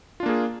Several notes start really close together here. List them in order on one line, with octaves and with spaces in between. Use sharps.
F4 D4 A#3 G#4